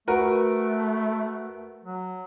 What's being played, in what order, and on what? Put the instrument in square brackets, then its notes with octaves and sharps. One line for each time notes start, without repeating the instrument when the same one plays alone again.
[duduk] A3 [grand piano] F#4 A#4 B4
[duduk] F#3